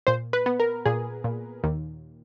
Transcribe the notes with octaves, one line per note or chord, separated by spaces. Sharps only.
A#2 C5
B4
B3
A#4
A#2 G#4
A#2
D#2